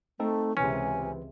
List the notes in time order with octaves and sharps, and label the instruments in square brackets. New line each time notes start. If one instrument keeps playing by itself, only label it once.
[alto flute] A3 [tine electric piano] C4 D#4 A4
[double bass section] C#2 C3 [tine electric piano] E3 B4 [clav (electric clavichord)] C#4 [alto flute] G#5